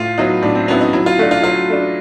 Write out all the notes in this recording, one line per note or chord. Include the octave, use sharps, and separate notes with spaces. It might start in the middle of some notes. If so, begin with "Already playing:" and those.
Already playing: A2 F4
F#3 B3 D#4 E4
A2 D4
C4
F#3 B3 C#4 E4
D#4
F#3 E4
F4
A3 D4 F#4
F4
F#3 F4
A3 D4